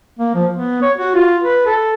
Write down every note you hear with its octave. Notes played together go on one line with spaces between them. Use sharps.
A#3
F3
B3
C#5
F#4
F4
B4
A4